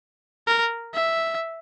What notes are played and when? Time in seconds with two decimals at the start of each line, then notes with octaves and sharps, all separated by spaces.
0.47 A#4
0.94 E5